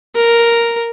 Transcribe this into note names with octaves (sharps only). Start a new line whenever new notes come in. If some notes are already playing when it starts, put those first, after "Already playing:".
A#4